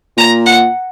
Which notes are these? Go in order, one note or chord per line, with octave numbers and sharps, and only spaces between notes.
A#2 A#5
F#5